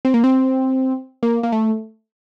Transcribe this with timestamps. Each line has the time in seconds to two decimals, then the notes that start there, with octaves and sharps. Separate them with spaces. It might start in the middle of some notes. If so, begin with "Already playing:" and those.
0.05 C4
0.14 A#3
0.24 C4
1.23 A#3
1.43 A#3
1.52 A3